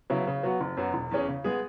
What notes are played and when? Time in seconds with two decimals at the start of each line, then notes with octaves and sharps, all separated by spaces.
0.10 C#3 F#3 B3 E4
0.27 C#3
0.43 F#3 B3 F#4
0.61 F#1
0.77 F#2 F#3 B3 F#4
0.94 E1
1.11 E2 E3 C#4 G#4
1.28 C#3
1.44 G#3 B3 G#4